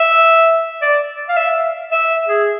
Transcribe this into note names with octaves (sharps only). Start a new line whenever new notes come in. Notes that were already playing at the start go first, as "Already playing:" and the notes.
Already playing: E5
D5
F5
E5
E5
G#4